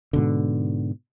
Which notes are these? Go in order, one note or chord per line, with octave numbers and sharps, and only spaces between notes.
G#2 B2 D3